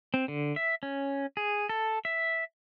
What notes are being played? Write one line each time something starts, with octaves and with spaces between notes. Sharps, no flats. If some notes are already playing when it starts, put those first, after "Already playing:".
C4
D3
E5
C#4
G#4
A4
E5